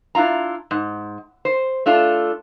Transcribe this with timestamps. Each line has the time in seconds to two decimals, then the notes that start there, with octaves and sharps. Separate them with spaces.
0.15 D4 E4 F4 A#5
0.71 G#2
1.45 C5
1.86 A3 D4 F4 A4